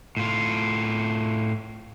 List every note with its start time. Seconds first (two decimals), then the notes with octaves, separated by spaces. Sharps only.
0.17 A2 F4